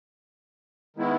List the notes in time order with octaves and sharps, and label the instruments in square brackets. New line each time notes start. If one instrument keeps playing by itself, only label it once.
[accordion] D#3 G#3 B3 E4